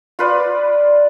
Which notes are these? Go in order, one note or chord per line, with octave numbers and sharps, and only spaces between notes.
F4 B4 D5